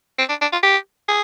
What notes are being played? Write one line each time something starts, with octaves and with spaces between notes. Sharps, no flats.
C4
D4
D4
F4
G4
G#4